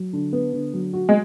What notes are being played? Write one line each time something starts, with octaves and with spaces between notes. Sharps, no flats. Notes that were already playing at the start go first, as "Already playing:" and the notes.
Already playing: F#3
D3
B3
D3
F#3
F#4
G#3